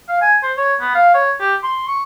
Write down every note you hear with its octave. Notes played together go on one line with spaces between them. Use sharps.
F5
G#5
C5
C#5
B3
F5
C#5
G4
C6
C#6